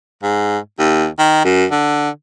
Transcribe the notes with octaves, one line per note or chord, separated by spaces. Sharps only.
G#2
D#2
D#3
F#2
D3